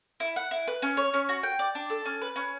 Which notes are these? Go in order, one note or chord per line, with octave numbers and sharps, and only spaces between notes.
E4
F#5
E4
B4
C#4
C#5
C#4
F#4
G5
D5
D4
A4
C#4
B4
C#4